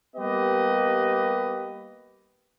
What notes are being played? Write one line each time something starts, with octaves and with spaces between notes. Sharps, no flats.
G3 A#3 B3 G4 B4 D#5